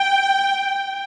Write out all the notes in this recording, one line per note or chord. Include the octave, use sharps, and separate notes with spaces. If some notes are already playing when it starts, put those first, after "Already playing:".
Already playing: G5